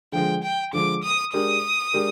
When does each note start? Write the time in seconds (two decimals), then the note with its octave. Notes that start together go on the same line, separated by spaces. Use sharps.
0.12 D3 F3 G#3 G5
0.43 G5
0.73 D3 F3 G#3 D6
1.03 D#6
1.33 G#3 D4 G4 A#4 D#6
1.93 G#3 D4 G4 A#4